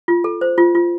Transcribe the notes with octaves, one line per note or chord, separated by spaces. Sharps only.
F4
A4
C5
F4
F4